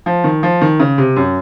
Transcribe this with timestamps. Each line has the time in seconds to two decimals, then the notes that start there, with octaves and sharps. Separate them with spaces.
0.06 F3
0.24 D#3
0.43 F3
0.61 D#3
0.80 C#3
0.98 C3
1.16 F#2